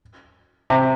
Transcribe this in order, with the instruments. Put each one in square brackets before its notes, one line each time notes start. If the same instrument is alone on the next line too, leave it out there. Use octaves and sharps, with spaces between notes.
[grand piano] C3